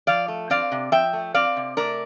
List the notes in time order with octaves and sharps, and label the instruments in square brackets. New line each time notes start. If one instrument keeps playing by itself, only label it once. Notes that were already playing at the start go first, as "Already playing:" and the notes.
[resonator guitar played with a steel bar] F3 D5 F5
A3
C4 D5 F5
C3
F3 E5 G5
A3
C4 D5 F5
C3
A3 A#4 D5